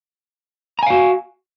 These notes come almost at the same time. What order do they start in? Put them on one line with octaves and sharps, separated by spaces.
A#5 G#5 F5 F#4